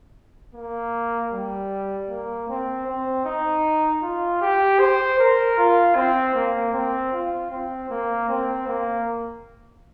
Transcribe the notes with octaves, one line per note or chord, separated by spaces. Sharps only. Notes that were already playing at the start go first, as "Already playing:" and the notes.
A#3
G3
A#3
C4
C4
D#4
F4
G4
C5
A#4
F4
C4
A#3
C4
F4
C4
A#3
C4
A#3